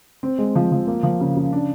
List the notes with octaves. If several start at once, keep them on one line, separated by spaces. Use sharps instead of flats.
C4
G#3
F3
F3
A#3
F3
C#3
C#3
D4